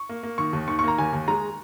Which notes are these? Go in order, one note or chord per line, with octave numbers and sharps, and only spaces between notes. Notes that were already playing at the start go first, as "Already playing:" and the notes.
Already playing: C#6
A#3
A#3
D#3 C#6
D#2
D#3 C#6
C#6
A#3 A#5
D#2 G#5
D#2
G#3 A#5